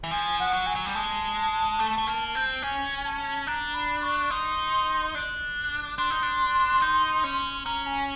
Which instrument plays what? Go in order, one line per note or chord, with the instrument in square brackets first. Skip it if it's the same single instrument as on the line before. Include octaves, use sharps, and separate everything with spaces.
[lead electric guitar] E3
[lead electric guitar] F3 [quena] G#5
[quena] F#5
[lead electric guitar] F#3
[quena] G#5
[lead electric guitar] F#3
G3
[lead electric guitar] G#3 [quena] A5
[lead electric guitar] A3
A3
A#3
C4
[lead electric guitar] C#4 [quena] G#5
[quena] G#5
A5
[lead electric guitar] D4 [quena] A#5
[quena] B5
C#6
[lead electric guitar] D#4 [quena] C6
[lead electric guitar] D4
[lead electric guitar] D4 [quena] C6
[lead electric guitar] D#4
D4
D#4
C#4
[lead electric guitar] C#4 [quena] A#5
[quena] G#5